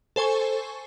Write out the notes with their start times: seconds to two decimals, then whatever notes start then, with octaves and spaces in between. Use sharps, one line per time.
0.16 A4 C5 G#5 C#6